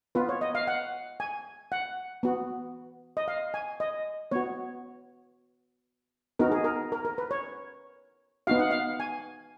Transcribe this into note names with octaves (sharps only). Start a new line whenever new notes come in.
B3 F4 B4
C#5
D#5
F5
F#5
G#5
F#5
B3 F#4
D#5
F5
G#5
D#5
B3 F#4 C#5
B3 D#4 F#4 A#4
G#4
A#4
A#4
A#4
B4
C#5
B3 D#4 F#4 F5
F#5
F5
G#5